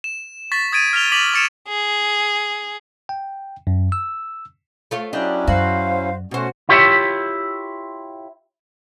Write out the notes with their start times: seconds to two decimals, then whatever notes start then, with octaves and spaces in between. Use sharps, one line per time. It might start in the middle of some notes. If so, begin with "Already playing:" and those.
0.04 E7
0.52 C#6 A6 B6
0.72 D#6 G#6 A6 D7 D#7
0.93 F6 B6 F7 G7
1.12 D6 A6 B6 D#7 F7 F#7
1.34 C#6 A6 C#7 D7 E7 F7
1.68 G#4
3.09 G5
3.67 F#2
3.92 E6
4.91 A3 F4 C#5
5.13 F#3 C#4 D4 E4 G4 D#5
5.48 F#2 F#4 C5 F5
6.31 B2 A3 C#4 F#4 C5
6.69 E4 F4 G4 C#5 D5 E5